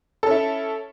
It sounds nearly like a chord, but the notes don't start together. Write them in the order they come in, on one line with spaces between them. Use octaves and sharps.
A4 C#4 E4